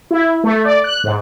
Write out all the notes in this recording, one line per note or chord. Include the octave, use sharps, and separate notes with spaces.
E4
A3
D5
F#6
G#2